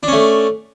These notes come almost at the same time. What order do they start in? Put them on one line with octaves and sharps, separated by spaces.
D4 C#4 A3